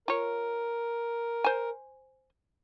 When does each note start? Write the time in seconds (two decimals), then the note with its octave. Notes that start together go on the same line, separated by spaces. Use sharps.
0.08 F4 A#4 C#5
1.44 C5 G#5